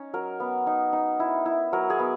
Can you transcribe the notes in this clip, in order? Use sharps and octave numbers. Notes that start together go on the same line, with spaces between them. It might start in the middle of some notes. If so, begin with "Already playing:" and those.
Already playing: C#4 D#4
F#3 A#4
B3
D#4
D#4
E4
E4
F#3 A#4
G#4
B3